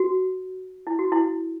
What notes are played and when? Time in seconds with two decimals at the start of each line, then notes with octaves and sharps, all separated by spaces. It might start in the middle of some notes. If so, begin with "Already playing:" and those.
Already playing: F#4
0.87 E4
0.99 F#4
1.12 E4